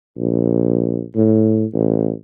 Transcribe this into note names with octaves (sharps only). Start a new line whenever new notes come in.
A#1
A2
A1